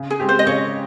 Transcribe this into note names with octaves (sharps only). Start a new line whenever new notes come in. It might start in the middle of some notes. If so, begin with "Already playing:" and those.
Already playing: C#3
G#4
G#3 C4 G4
C5
D#5
C#3 C#5